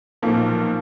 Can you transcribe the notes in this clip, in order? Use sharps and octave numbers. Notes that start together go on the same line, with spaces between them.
B1 A#2 F3